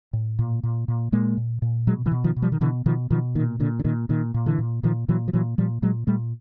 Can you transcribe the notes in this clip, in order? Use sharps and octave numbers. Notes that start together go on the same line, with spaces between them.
A2
A#2
A#2
A#2
A#2 G#3 A#3
A#2
A#2
B2 F#3 G#3
D3 E3
B2
D#3 F3
B2
F3 G3
D#3
B2 D3 E3
B2 D#3 F3
B2 D#3 F3
A#2 D#3
A#2 D3
D3
A#2 D#3
A#2 D#3
A#2
D3 E3
A#2
A#2 D#3 F3
A#2 E3 F#3
F3
A#2 E3 F#3
A#2 F3 G3
A#2 F#3 G#3
A#2 G3 A3